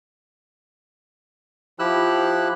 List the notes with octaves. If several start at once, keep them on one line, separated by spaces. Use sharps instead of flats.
F3 E4 G4 E6 F#6